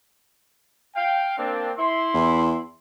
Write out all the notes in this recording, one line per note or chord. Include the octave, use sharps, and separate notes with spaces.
F5 G5
A#3 C4 D4
E4 C6
E2